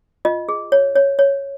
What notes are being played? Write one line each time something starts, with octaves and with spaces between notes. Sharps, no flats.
F4 D#5
G#4
C#5
C#5
C#5